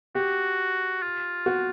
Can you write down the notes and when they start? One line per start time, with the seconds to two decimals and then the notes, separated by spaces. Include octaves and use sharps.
0.15 F#4 G4
1.02 F4
1.46 F#4